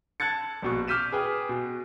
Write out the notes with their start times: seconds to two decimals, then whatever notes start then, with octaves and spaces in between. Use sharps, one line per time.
0.20 A5 F#6 G#6 A6 C#7
0.62 A#1 B2 C#6
0.88 D6 F6 G6 B6 D#7 E7
1.12 G#4 B4 G5
1.49 B2